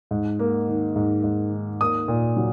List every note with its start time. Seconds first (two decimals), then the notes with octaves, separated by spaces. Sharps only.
0.11 G#2
0.39 A#3
0.68 D#3
0.96 G#2
1.24 G#2
1.52 D#3
1.81 A#3 D#6
2.08 A#2
2.37 F#3